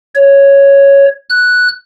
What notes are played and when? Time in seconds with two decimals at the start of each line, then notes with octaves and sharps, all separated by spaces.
0.15 C#5
1.30 F#6